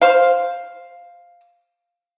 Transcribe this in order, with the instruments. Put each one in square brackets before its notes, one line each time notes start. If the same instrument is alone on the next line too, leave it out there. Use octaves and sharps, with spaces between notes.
[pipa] C5 F5